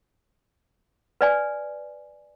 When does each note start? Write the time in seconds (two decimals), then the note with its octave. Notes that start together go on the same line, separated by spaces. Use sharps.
1.21 B4 D5 G#5